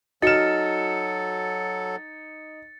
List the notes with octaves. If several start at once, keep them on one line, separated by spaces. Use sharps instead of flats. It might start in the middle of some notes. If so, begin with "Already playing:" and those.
F#3 D#4 F#4 A4 F6 A6 C#7 E7